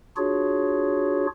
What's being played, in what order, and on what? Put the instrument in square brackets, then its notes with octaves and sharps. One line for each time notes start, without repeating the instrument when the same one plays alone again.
[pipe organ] D4 F4 F#4 G#4 C#5